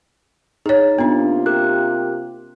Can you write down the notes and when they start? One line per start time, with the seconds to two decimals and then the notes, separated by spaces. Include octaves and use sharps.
0.66 D#4 G#4 C#5 A6
0.98 C3 A#3 B3 D4 F4
1.46 G4 A#4 F#6